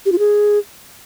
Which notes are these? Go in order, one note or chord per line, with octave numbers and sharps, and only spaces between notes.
G4
F4
G#4